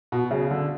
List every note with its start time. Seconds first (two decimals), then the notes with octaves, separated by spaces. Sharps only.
0.12 B2
0.31 C#3
0.51 D3